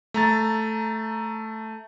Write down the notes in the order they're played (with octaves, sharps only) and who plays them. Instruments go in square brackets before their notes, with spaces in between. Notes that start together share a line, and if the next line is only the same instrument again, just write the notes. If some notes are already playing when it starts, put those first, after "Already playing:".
[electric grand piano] A3 A#5 A6